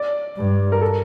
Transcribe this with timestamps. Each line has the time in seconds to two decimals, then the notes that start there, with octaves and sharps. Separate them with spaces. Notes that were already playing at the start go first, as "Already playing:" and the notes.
Already playing: D5
0.36 G2
0.72 A#4
0.81 A4